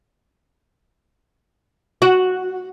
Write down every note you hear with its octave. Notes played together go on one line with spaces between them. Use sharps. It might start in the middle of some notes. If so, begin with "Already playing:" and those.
F#4